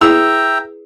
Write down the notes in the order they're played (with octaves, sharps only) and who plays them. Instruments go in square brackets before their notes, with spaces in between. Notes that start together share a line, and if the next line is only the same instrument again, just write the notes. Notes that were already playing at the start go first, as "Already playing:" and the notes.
[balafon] E4 [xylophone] G#4 B4 D#6 [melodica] E5 G5 A#5 [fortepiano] E6